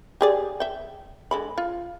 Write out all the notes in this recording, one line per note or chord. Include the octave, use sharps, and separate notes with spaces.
G4 G#4 D5
E5 G5
D3 G#3 B5
F4